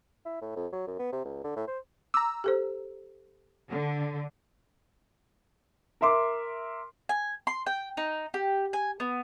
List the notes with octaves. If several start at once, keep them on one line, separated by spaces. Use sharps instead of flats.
E4
A2
F2
F#3
F#2
B3
C3
C#2
D3
A2
C5
A#5 D6 E6
G4 A4 C5
D3
A#4 E5 C6 D6
G#5
C6
G5
D#4
G4
G#5
B3